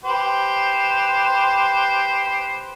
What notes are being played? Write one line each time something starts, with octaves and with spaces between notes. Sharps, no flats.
G4 B4 C5